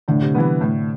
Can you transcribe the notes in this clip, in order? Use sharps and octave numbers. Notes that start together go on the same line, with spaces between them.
A2 D3
C3
E3 G3 B3
A2